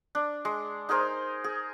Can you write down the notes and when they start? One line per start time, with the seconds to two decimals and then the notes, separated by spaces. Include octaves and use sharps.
0.15 D4
0.45 G#3
0.89 D#4 G#4 A#4 C5
1.44 G#4